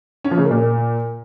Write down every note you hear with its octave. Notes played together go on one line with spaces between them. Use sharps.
C#4
F3
C#3
A#3
A#2